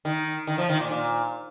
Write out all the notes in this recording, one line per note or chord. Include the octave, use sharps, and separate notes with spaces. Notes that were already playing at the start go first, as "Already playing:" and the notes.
D#3
D#3
F3
D#3
A#2
A#2